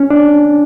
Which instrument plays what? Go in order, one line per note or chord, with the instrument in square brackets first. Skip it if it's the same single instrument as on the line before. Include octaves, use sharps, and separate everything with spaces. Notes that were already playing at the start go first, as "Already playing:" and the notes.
Already playing: [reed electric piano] C#4
D4